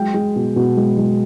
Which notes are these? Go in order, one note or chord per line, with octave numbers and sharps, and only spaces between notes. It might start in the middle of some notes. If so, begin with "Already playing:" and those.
Already playing: F#3 G#3 G5
G#3
B2
B2
G#3
G#3